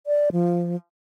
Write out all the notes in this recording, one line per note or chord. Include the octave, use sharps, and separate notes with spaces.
D5
F3